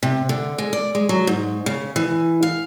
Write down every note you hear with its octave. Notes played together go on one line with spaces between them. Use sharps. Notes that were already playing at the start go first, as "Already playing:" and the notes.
C3
D3
G#3
D5
G#3
F#3
G#2
C#3
E3
F5